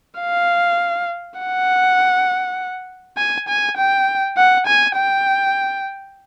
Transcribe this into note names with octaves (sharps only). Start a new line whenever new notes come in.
F5
F#5
G#5
G#5
G5
F#5
G#5
G5